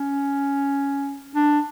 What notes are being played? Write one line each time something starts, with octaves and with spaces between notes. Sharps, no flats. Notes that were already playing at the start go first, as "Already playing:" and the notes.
Already playing: C#4
D4